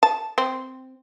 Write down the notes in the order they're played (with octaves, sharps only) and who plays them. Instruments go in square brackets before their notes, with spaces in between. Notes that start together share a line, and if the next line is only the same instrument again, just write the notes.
[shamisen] A5
C4